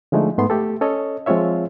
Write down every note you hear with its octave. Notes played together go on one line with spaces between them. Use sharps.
D3 F3 G#3 A3 D#4
G#2 A3 B3 C6
A3 G4 A4
C#4 A4 C#5 D#5
F3 G#3 C4 F4 C#5 E5